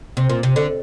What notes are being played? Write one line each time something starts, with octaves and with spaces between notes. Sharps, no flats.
C3
A#2
C3
D3